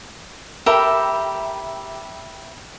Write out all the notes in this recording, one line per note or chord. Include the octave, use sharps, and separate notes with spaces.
G4 A4 A#4 E5 G5 B5